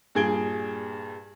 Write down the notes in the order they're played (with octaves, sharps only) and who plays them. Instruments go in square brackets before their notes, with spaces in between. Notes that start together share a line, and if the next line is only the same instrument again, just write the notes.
[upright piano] G2 A#2 G#4 G#6 D7 G7